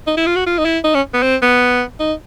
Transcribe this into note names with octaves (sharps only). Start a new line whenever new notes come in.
D#4
E4
F4
F#4
F4
D#4
E4
D#4
C#4
B3
C4
B3
D#4